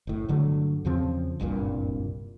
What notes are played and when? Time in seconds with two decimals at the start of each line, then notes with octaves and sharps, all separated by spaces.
0.07 F#1 A2
0.29 G1 D3 F#3 A3
0.85 E2 C#3 F3 C4
1.40 F#1 C2 G2 A#2